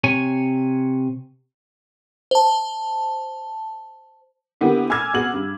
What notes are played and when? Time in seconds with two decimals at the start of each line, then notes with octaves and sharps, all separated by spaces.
0.04 C3 C#5 G#5
2.31 C5 A5
4.61 D3 A#3 B3 E4 G4
4.90 G#5 D6 E6 F6 G#6
5.14 B3 F#4 G#4 F#7
5.34 G2